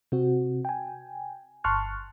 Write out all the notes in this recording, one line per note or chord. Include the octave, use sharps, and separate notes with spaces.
C3 C4 F#4
G5 G#5
G1 A5 C6 C#6 F6 F#6